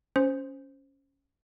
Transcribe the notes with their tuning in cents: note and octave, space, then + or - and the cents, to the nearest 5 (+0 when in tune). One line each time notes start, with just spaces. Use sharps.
C#4 +0 C5 +0